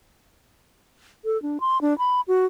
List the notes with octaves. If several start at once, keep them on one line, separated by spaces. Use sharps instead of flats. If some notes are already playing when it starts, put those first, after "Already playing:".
A4
D4
C6
D4
B5
F#4